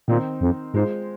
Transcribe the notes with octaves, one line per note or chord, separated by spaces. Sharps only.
A#2 D#3 C4 D#4
F2
G#2 G#3 F4 C5